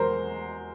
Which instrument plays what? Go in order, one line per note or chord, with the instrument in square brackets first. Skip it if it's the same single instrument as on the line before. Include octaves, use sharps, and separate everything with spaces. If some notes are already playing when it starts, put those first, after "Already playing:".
Already playing: [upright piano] E2 B2 G#3 A#4 C5